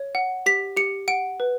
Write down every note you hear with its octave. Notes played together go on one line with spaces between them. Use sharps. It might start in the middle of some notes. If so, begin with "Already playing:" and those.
Already playing: C#5
F#5
G4 B6
G4 C#7
F#5 D7
B4